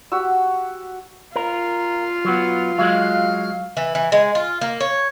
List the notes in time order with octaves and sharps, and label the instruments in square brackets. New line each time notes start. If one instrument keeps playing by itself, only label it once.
[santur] F#4 G4 E6
[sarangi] F4 [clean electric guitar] A#4
[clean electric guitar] F#3 B3
[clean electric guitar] F#3 G#3 [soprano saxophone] F5
[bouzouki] E3
E3
G#3
F4
A#3
C#5